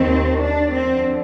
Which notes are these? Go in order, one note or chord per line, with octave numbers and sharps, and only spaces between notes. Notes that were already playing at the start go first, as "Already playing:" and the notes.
Already playing: D#2 D#3 C4
D4
F2 D3 C4